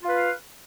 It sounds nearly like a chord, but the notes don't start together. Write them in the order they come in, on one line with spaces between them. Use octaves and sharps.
F4 B4 F5